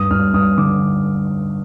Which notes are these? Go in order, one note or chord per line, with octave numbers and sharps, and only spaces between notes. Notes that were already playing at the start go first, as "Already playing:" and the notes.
Already playing: G2 D#6
G2 F6
G2 D#6
D3 D6